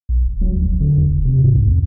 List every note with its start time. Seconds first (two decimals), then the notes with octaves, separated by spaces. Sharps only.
0.09 B1
0.25 D#1
0.41 F#3
0.56 D2
0.68 F1
0.80 D3
0.97 E2
1.11 E1
1.25 C3
1.43 G#2
1.55 C2
1.67 F2